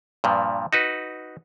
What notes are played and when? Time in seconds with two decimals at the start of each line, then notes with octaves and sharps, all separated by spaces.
0.24 G2 A#2 F3
0.73 D#4 F#4 B4